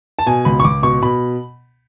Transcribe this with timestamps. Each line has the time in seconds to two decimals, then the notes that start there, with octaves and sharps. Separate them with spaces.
0.19 A5
0.26 B2 G#5
0.45 C#2 B5
0.60 C#6
0.64 C#2 D6
0.83 B2 C#6
1.02 B2 B5